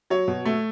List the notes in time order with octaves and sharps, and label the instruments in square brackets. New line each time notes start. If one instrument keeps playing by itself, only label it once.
[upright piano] F#3 C#5
B2
A3